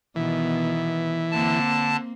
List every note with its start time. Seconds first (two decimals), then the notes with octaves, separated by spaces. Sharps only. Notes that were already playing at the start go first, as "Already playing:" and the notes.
0.16 B2 D#3 E3 B3
1.31 D3 A#3 C4 A5